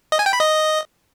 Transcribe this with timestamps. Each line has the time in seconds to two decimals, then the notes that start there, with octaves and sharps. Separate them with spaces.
0.12 D#5
0.19 G#5
0.26 G5
0.33 B5
0.40 D#5